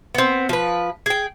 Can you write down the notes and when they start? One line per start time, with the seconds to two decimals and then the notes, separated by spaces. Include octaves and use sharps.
0.15 B3 C4
0.49 F3 B4
1.06 G#4 G5